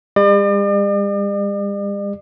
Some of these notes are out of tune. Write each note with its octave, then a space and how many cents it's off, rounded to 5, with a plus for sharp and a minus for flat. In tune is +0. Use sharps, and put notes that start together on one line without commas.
G3 +45 D5 +45